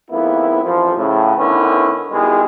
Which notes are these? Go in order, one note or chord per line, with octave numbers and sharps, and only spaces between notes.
F2 G#2 A#3 B3 E4
A1 F2 F3
A2 C#3
D3 D#3 B3 C#4 E4 B4
B2 D#3 G3 G#3 E4 G#4